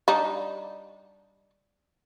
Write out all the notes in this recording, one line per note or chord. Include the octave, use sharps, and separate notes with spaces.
G3 D4 D#4